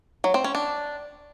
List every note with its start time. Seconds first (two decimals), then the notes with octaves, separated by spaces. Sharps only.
0.24 F#3
0.34 C4
0.44 C#4
0.55 D4